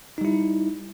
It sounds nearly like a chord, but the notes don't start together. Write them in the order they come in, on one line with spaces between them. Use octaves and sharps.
D#4 G3 E4